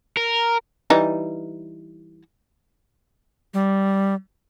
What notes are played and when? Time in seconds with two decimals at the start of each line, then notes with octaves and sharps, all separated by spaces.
0.17 A#4
0.90 E3 G3 D#4
3.54 G3